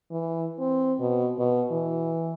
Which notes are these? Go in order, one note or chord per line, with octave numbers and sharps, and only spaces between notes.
E3
C4
B2
B2
E3